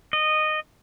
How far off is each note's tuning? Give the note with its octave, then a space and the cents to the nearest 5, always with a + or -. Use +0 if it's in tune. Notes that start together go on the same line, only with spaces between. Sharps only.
D#5 -15